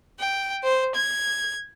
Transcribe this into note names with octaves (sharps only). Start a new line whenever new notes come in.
G5
C5
G#6